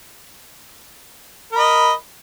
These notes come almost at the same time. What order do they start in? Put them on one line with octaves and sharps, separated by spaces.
A#4 B5 D#5